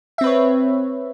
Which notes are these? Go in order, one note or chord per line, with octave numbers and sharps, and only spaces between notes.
C4 B4 C#5 E5